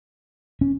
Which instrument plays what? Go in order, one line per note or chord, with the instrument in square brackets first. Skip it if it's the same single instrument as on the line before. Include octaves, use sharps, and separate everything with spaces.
[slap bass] C#4